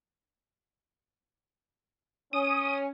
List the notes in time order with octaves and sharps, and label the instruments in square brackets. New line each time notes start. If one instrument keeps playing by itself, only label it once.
[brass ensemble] C#4 [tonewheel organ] D#6